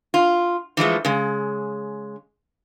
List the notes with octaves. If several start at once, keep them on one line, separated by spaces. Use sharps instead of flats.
F4
E3 F3 G#3 A3
C#3 G#3